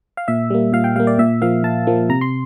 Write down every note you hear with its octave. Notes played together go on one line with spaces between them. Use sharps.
F5
A#2 E5
G3 A#3
A#2 F5
G5
G3 A#3 F5
D5
A#2 E5
F3 A#3 F5
A#2 A5
F3 A#3
C3 A#5
C6